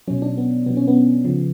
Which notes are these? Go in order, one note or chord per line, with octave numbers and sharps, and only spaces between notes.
B2 F#3 C#4
D4
B3
B2 F#3 B3
C#4
B3
C#3 F3